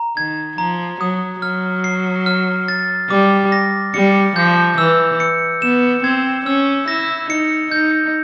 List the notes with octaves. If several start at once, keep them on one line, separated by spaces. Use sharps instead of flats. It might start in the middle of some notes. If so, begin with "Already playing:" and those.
Already playing: A#5
D#3 G#6
F3 A#5
F#3 D#6
F#3 F6
C7
F6
A6
G3 D6
A#6
G3 C#7
F3 G6
E3 E6
C#7
B3 E7
C4 G#6
C#4 E6
E4 A#6
D#4 C#7
D#4 G6